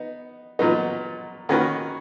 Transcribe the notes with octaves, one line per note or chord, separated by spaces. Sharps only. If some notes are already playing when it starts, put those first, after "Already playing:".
Already playing: B3 D#4
A#2 F#3 B3 D#4
D#3 A#3 C#4 F#4 B4